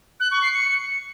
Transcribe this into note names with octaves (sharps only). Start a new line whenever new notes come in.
F#6
C#6
C7
C#7